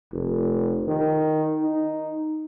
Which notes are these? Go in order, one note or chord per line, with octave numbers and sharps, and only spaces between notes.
F1
D#3
D#4